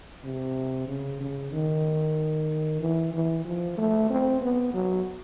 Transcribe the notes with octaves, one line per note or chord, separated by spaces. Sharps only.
C3
C#3
C#3
D#3
E3
E3
F3
A3
C4
B3
F#3